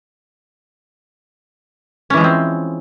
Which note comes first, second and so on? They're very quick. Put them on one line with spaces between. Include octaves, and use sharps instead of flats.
C#4 E3 G#3 F3 C4